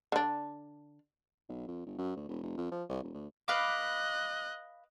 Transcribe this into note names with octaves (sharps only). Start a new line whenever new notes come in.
D3 D4
B1
F2
G1
F#2
D2
E1
F1
F2
F3
C2
E1
D2
B4 D#5 F5 D6 F#6